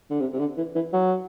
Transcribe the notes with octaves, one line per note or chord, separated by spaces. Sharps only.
D3
C3
C3
D3
E3
E3
F#3